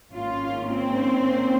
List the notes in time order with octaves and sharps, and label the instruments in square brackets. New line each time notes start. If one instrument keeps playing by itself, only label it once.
[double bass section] G#1 G#2 D#3 A#3 C#4 [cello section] F4
[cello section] C4